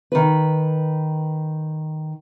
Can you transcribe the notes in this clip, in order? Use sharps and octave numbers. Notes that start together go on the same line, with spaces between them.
D#3 B4